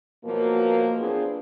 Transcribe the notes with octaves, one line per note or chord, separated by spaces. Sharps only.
B2 F3 F#3 A#3
B3 C4 D4 F4 G#4 C5